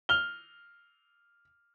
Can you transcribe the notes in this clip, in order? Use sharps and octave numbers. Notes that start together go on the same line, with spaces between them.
F6 G7